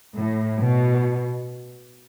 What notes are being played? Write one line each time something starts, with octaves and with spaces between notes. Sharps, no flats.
A2
B2